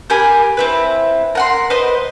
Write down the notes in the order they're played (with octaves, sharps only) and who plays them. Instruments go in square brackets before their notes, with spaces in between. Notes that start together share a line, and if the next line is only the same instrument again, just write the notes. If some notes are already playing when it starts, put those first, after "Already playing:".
[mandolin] G4 A#4 G#5 B5
C4 E4 B4
A#4 F#5 C6
B4 C5 D#5